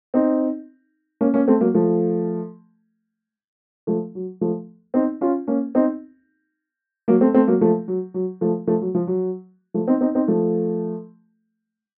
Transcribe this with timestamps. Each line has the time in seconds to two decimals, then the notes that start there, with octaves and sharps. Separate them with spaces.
0.14 C4 D#4
1.21 A#3 C#4
1.34 A#3 C#4
1.48 A3 C4
1.61 F#3 A#3
1.74 F3 A3
3.87 F3 A3
4.15 F#3
4.41 F3 A3
4.94 C4 D#4
5.21 C#4 F4
5.47 A#3 C#4
5.75 C4 D#4
7.08 F#3 A#3
7.21 A3 C4
7.34 A3 C4
7.47 F#3 A#3
7.61 F3 A3
7.88 F#3
8.14 F#3
8.41 F3 A3
8.67 F3 A3
8.82 F#3
8.95 F3
9.07 F#3
9.74 F3 A3
9.88 C4 D#4
10.01 C4 D#4
10.15 C4 D#4
10.28 F3 A3